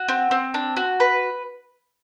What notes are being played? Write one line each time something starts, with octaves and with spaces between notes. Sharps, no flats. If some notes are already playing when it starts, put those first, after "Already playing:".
Already playing: F#4
C4
C4
D4
F#4
B4